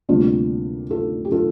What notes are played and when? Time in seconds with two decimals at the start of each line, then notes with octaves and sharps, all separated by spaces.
0.09 D2 C3 G3 A#3 D4 F4
0.90 F4 A4
1.25 G4
1.32 F4 A4